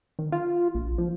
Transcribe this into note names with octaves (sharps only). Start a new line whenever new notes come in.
D#3
F4
A#1
F3